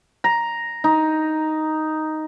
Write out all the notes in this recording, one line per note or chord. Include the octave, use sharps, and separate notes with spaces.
A#5
D#4